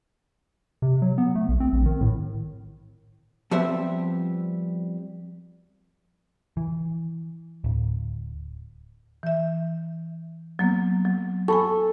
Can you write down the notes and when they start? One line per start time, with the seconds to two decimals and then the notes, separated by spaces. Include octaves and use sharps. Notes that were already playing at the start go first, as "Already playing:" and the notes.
0.82 C3
1.02 F#3
1.18 B3
1.35 A3
1.49 B1
1.60 C4
1.73 A#1
1.86 D#3
2.01 A2
3.51 F3 G3 B3 C4 C5 E5
6.57 E3
7.64 D1
9.23 E3 E5
10.59 F#3 A#3 B3
11.05 F#3
11.48 A4 G#5 B5 C#6